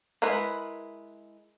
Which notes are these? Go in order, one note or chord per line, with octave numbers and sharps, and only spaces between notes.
G#3 E4 A#4 B4